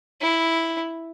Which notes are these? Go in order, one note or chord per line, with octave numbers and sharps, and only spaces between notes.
E4